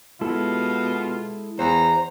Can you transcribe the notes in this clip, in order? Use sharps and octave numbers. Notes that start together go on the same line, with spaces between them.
B2 G#3 E4 F4 A4
E2 C5 A#5